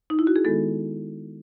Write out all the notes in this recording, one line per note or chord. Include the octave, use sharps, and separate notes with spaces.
D#4
E4
F#4
G#4
D#3 G#3 B3 A4